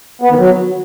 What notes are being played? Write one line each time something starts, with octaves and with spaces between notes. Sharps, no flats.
B3
D#3
F#3